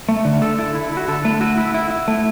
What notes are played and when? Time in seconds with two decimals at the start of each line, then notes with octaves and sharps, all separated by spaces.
0.09 A3
0.25 D3
0.42 D3 A4
0.59 E4
0.75 E4
0.92 E4
0.97 F#4
1.08 D3 A4
1.25 A3
1.41 E4 F#4
1.57 E4
1.74 E4
1.91 E4
2.08 A3